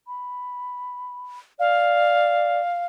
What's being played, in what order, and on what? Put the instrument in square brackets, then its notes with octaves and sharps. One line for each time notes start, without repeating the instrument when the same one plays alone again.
[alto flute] B5
[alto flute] D5 [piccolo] F5